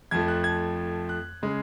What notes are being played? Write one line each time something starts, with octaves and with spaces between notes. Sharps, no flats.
F2 F3 A3 G#6
F#6
G#6
F#6
C#3 G#3